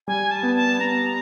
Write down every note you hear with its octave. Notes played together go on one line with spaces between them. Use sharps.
G3 G#5
A5
B3
A5
B3 A#5